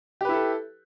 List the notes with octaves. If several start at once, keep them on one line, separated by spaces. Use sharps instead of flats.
E4 G4 A4 B4